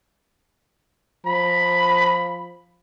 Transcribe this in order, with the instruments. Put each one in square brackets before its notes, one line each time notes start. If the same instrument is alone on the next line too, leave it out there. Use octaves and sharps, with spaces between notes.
[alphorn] F3 [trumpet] B5